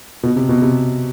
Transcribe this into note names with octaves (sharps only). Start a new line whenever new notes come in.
B2
C3
B2
C3